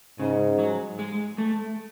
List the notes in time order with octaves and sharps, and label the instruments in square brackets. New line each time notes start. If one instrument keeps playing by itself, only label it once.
[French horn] G#2 [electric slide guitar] C#3
[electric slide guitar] F#3
G#3
A3